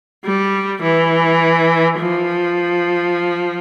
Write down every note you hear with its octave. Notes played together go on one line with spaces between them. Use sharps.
G3
E3
F3